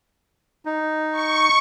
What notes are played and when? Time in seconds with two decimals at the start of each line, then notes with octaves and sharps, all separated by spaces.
0.65 D#4
1.12 C#6